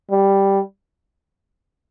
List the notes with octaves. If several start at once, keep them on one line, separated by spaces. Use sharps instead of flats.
G3